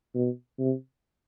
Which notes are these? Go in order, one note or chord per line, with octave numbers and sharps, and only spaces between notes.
B2
C3